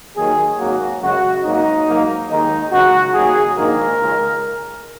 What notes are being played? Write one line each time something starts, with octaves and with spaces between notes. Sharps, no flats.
D#2 D#3 F#3 G#4
G#1 F#2 F#3 A#3 F#4
F#2 C#3 G#3 F#4
G#1 G#2 F#3 A#3 D#4
G#2 F#3 A#3
D#2 D#3 G#3 D#4
C#2 C#3 F#3 F#4
D#2 C#3 F#3 G#4
A#1 G#2 D#3 A#3 A#4
C#2 C#3 G#3